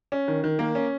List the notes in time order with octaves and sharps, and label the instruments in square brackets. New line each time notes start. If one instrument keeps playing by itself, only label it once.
[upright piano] C#4
D#3
D#3
A#3
C#4